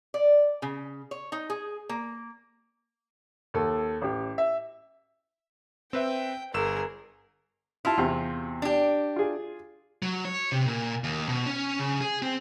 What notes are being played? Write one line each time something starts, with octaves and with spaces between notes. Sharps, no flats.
D5
C#3
C#5
D#4
G#4
A#3
D#2 A4
A1 G4
E5
C4 B4 E5 G5
G1 G#4 A#4 E6 E7
E4 F4 E5 A5
E2 C3 C4
D4 G4
F4 G#4
F#3
C#5
C3
A#2
D#2
B2
C#4
C#3
G#4
C4